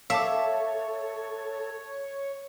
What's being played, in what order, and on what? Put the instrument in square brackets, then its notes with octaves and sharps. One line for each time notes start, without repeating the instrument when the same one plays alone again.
[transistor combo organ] A4 [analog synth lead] C#5 [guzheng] E5 [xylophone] F5 A5 D6